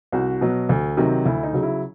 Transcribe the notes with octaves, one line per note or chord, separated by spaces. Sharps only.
C2 F#4
B2 F#3
D2
C3 D#3 F#3
D2 E4
D#4
C#3 F#3
E4